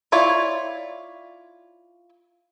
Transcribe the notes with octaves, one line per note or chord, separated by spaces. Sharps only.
E4 F4 C#5 D5